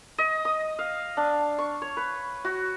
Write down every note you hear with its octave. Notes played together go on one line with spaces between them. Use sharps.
D#5
D#6
F5
D4
C#6
C#5
B4
F#4